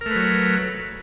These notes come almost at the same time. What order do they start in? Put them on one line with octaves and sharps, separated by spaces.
A#4 A3 B4 F#3